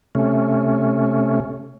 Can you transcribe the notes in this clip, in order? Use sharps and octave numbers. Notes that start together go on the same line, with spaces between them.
C3 A3 C#4